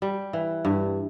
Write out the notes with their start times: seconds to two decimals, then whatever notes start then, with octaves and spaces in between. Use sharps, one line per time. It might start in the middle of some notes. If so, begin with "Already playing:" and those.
0.02 G3
0.33 E3
0.65 G2